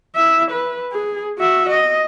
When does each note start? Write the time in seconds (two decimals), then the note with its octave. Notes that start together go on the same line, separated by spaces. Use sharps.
0.16 E4 E5
0.51 B4
0.93 G#4
1.38 F#4 E5
1.70 D#5